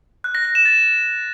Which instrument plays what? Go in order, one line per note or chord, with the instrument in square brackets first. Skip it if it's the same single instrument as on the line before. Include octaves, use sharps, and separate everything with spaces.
[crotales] F#6
A#6
A#6
E7
A6